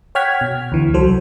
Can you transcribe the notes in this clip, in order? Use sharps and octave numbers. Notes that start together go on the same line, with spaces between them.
C#5 F#5 G5 F6 G#6 B6
B2
D2 E3
C2 F#3 A4 C5